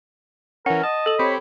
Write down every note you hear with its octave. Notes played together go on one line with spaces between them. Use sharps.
E3 C#4 A#4 F#5
D#5 A5
A4 F#7
C4 G4 C#5 B5